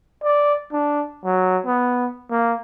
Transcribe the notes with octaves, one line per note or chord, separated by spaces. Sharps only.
D5
D4
F#3
B3
A#3